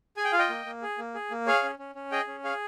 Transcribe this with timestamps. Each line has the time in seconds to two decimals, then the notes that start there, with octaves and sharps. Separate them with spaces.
0.17 G#4 G#5
0.25 G5
0.32 F4 F5
0.39 D#5 G5
0.49 A#3
0.66 A#3
0.82 G#4
0.98 A#3
1.15 G#4
1.31 A#3
1.46 G#4 C#5 F5
1.63 C#4
1.79 C#4
1.95 C#4
2.11 G#4 D#5 G5
2.27 C#4
2.44 G#4 C#5 F5